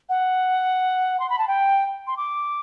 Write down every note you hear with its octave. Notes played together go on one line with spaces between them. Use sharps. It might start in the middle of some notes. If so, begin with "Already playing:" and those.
F#5
C6
B5
A5
G5
C6
D6